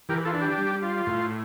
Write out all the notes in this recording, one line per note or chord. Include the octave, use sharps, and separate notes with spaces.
E3 G4 A#4
F4 A4
D4
G4
G3
F4
A2